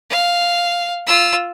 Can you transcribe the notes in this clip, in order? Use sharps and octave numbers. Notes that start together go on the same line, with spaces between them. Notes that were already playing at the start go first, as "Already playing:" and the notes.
F5
F4 E6